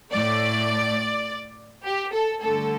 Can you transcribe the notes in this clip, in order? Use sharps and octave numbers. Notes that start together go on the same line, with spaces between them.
A2 A3 D5
G4
A4
G2 D3 A3 A4